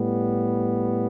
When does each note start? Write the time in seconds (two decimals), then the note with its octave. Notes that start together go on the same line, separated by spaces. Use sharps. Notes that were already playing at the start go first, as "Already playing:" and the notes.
Already playing: A2 G3 B3